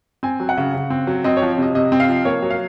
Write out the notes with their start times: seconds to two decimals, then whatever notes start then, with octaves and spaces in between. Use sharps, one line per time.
0.23 C4 G#5
0.40 F#3
0.49 F#5
0.58 C#3
0.74 C#3
0.90 C4
1.07 F#3
1.24 C4 D#5
1.37 C#5
1.42 F3
1.58 C3 D#5
1.75 C3 D#5
1.92 C4
2.00 F5
2.09 F3
2.25 A#3 C#5
2.42 F#3
2.50 F5